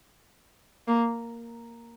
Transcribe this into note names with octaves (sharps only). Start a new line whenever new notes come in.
A#3